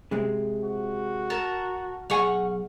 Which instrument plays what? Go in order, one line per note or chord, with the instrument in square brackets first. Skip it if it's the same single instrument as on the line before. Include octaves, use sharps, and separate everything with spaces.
[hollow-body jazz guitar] C3 G#3 C4
[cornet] F#4
[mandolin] A#4 A5
[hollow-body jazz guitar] B1 G#4 G#5 [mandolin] F#5 C#6 F6